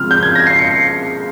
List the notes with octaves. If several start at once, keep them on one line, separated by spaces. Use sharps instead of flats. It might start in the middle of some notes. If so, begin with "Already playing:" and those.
Already playing: C#3 F3 G#3 C4 F6
G6
G#6
A#6
C7
C#7